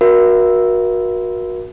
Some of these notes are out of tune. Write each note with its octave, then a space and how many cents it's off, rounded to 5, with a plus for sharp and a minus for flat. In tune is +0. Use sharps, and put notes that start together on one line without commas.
F#4 -15 A#4 +35 E5 +20